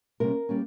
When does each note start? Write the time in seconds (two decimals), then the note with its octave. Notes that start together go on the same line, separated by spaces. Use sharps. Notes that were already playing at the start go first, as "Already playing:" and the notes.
0.20 C3 G3 A#3 C#4 A#4
0.49 G3 A#3 C#4